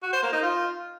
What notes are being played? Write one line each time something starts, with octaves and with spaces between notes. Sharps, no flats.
F#4
C5
A#3
D#4
F4